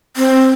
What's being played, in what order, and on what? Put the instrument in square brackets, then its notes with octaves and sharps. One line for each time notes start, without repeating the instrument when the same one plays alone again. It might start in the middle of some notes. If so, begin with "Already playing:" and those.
[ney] C4